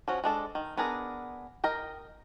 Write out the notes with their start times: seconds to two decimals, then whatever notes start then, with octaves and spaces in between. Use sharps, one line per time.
0.08 F3 C#4 F#4
0.24 G#3 D4 A4
0.55 D#3
0.77 B3 D4 G#4 A#4
1.64 A#4 D#5 G5